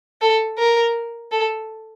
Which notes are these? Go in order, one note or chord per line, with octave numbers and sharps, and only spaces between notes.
A4
A#4
A4